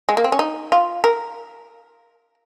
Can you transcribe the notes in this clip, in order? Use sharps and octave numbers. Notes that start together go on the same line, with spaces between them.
G#3
A#3
C4
C#4
D#4
F4
A#4